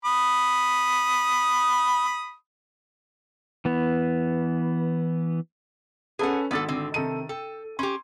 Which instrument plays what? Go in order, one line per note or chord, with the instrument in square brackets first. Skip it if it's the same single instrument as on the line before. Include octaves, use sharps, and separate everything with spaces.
[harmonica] B5 D#6
[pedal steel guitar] E3 B3
[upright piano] C#4 A4 B4 [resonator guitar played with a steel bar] G#4 F#5
[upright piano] G#1 E6 A6 [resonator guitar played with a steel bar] B3 D4 A4
[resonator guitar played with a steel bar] D3 C4
[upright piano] C3 A4 D#7 [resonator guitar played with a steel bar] D#3
[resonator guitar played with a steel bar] A4 [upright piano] G5
[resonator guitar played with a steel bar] C#4 G4 [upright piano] C6